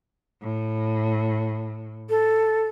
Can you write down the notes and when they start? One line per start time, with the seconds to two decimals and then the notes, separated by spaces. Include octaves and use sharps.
0.43 A2
2.09 A4